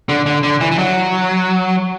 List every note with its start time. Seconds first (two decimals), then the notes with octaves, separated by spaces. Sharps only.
0.09 D3
0.26 D3
0.43 D3
0.61 E3
0.71 E3
0.78 F#3